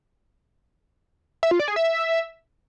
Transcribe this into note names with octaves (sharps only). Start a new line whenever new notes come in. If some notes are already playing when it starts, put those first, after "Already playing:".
E5
F4
D5
G#4
E5